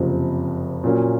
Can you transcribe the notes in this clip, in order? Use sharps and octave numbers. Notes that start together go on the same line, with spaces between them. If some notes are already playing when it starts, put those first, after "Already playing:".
Already playing: F#1 F2 C3 F3
A#2 F#3 A#3 C#4